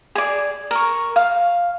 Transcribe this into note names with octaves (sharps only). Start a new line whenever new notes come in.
G#4 D5
A#4 C#6
F5